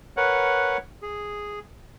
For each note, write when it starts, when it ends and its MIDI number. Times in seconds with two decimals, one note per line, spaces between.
0.17 0.77 70
0.17 0.77 71
0.17 0.77 73
0.17 0.77 78
1.02 1.59 68